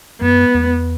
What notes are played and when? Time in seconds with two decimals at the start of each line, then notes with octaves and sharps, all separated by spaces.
0.21 F#2 B3
0.54 E2